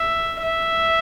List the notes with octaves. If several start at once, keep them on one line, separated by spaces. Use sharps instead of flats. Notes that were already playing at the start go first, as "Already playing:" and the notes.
Already playing: E5
E5